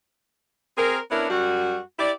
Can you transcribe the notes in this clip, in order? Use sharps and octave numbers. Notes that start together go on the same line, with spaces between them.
C4 G#4 A#4
B3 C#4 D4 E4 A#4
F#2 G3 F#4
E4 G4 D5